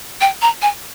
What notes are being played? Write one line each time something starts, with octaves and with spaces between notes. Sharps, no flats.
G5
A#5
G#5